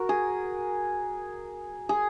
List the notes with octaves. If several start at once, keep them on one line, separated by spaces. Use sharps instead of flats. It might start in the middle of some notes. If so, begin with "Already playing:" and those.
Already playing: F#4 A#4
G#4
G#4